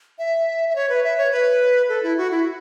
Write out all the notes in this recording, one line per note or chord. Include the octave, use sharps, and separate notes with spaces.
E5
E5
C#5
B4
E5
C#5
B4
A4
E4
F#4
E4